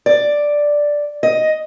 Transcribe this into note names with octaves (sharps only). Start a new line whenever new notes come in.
D5
D#5